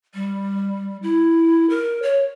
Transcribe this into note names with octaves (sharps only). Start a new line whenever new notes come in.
G3
E4
A#4
C#5